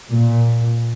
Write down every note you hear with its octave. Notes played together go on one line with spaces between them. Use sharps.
A#2